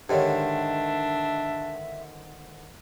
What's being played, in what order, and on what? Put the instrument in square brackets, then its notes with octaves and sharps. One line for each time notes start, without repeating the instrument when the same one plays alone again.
[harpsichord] G#2 D3 D#3 [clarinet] D4 [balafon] G4 C#5 [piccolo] E5